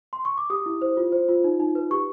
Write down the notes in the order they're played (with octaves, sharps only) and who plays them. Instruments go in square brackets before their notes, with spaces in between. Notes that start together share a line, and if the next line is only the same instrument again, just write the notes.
[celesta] C6
C#6
D6
G4 D#6
E4
C5
F4
C5
F4
D#4
D#4
B4
G4 C#6